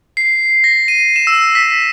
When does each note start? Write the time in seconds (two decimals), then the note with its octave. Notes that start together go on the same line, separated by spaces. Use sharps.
0.17 C7
0.64 A#6
0.88 D#7
1.16 E7
1.27 E6
1.55 B6